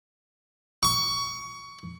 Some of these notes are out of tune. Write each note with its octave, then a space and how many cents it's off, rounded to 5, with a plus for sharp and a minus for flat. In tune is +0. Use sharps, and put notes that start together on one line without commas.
C#6 +20